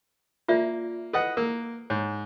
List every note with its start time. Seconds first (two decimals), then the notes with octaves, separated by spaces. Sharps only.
0.48 A#3 F4 D5 E5
1.13 A4 B4 D#5 F#5
1.37 A#3 A#4
1.90 G#2 C#5